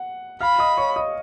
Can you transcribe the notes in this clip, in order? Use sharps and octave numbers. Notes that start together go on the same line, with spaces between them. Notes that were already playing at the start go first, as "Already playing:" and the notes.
Already playing: F#5
F5 B5 F6
D#5 D#6
C#5 C#6
D#5 D#6